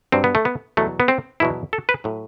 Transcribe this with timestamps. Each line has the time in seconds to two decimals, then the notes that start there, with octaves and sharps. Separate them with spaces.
0.12 G2 F#3 C4
0.24 B3
0.35 A3
0.45 B3
0.77 E2 B2 F#3 A3
1.00 B3
1.08 C4
1.40 E2 B2 F#3 E4
1.73 A4
1.89 B4
2.04 A2 F#3